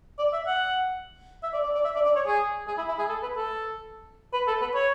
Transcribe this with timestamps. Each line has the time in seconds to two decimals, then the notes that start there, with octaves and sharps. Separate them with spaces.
0.19 D5
0.33 E5
0.47 F#5
1.43 E5
1.53 D5
1.64 D5
1.75 D5
1.85 E5
1.95 D5
2.05 D5
2.16 C#5
2.26 G#4
2.67 G#4
2.78 E4
2.88 E4
2.98 G#4
3.09 A4
3.23 B4
3.36 A4
4.33 B4
4.47 A4
4.61 B4
4.74 C#5